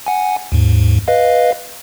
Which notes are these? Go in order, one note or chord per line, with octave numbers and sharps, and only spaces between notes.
F#5 G#5
D#2 G#2
B4 D#5 F5